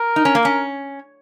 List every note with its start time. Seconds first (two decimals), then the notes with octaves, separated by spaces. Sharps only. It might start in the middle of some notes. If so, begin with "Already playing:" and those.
Already playing: A#4
0.16 D#4
0.25 C#4
0.35 A#3
0.45 C#4